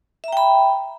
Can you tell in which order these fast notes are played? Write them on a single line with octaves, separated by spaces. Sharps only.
E5 A#5 G5 B5